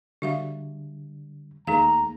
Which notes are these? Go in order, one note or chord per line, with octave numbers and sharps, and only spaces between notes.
D3 G3 F#4 E5 F5
D#2 A3 A#3 D#4 G#4 F5 A#5